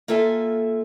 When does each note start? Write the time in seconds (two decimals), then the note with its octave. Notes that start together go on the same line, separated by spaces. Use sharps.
0.08 A#3 F4 A4 E5 G#5